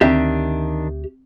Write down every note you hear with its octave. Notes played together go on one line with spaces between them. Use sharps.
D2 D#3 C4 D4 G4 E5